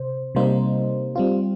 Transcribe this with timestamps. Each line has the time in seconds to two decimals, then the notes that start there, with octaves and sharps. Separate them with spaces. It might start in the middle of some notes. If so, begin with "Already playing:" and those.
Already playing: C3 C5
0.35 C3 G3 A#3 D#4 C5
1.16 G3 C4 F4